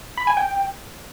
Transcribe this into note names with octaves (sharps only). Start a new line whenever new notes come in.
B5
G#5
G5